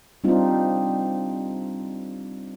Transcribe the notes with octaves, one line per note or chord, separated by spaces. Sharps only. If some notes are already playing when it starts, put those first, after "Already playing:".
G3 C4 D4 D#4 F4